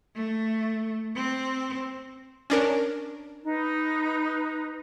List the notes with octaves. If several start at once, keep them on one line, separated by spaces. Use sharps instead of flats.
A3
C4
C#4 D4 A#4
D#4 B4